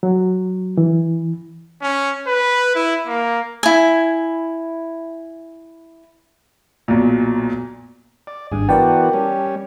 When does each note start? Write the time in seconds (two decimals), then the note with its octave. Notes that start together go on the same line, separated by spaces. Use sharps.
0.03 F#3
0.77 E3
1.82 C#4
2.27 B4
2.75 E4
3.07 A#3
3.63 E4 G#5
6.88 B1 A#2
8.27 D5
8.52 G#1 G2 G#4
8.69 E3 B3 F#4 A#4 D5 G5 A5
9.13 G3 C#4